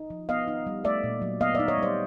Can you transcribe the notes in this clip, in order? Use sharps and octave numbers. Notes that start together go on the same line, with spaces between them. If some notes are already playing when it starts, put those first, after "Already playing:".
Already playing: D#4
F3
B3 D#5 F5
D#4
G3
A3 D5 E5
A#2
F#3
B3 D#5 F5
D#4 D5 E5
C#5 D#5
G3 C5 D5